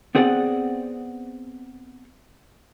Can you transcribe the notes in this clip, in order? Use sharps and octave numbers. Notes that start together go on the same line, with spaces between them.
B3 C4 G#4 D5 F#5